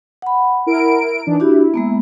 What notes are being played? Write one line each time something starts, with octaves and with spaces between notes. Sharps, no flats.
F#5 B5
E4 A#4 D7
E3 D4 D#4
D4 E4 F#4 G4
G#3 A#3 B3